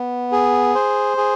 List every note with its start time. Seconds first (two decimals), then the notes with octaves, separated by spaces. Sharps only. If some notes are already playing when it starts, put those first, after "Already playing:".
Already playing: B3
0.32 G#4
0.75 C5
1.17 G#4